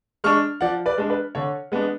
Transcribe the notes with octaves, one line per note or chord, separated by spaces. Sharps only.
G#3 D4 C#6 F6
F3 D5 F#5
B4 D5
G#3 D4
B4
D3 C#5
G#3 B3 D4